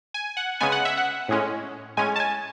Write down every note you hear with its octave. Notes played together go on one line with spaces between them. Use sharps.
G#5
F#5
C#3 G#3 B3 G#5
F#5
E5
F#5
A2 G#3 C#4
A2 G#3 C#4 G#5
A5
G#5